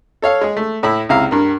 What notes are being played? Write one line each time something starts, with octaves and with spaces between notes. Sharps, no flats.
A4 C#5 F5
G#3 G#4
A3
A2 E4 E5 B5
C#2 C3 E4 F5 A#5
G2 A#4